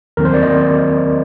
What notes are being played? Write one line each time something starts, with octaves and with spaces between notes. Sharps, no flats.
D#2 D#3 F#3 C4 A#4
C5
D5
D#5